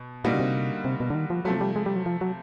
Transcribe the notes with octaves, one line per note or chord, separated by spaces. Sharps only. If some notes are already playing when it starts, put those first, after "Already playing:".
Already playing: B2
A#2 D3 G3 A#3 D#4 F#4
C#3
C3
C3
B2
D3
D#3
F3
C3 F3 F#3 A3
G3
G#3
G3
F#3
F3
F#3